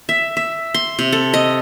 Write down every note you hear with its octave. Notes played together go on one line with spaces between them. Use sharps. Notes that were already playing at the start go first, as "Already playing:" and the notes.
E5
E5
C6
C3
A4
D#5